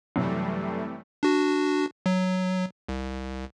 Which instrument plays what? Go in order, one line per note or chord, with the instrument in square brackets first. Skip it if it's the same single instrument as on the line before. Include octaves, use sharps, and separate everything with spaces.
[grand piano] F#2 [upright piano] C3 [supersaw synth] E3 G3 A3
[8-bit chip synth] D4 F#4
F#3
C2